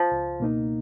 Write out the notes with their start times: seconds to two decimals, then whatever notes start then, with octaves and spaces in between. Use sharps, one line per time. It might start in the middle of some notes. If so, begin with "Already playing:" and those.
Already playing: F3
0.12 C#2
0.40 B2 A#3 D#4